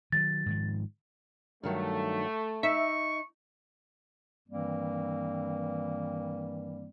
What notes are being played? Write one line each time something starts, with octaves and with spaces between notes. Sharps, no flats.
D#3 F3 F#3 A6
G#2 D#3 F3
G2 D#3 F#3 A3
D#4 E5 C#6
G2 D#3 E3 G3 A#3 C4